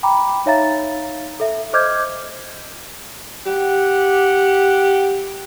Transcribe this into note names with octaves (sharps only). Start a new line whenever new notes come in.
G5 A#5 B5 D6
D#4 C#5 E5 F5 A#5 A6
A4 E5
C5 D#5 D6 F6 G6 G#6
G4 F#5